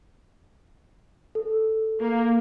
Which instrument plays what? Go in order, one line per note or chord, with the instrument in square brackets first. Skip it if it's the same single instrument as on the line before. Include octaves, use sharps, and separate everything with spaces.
[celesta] A4
[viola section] A#3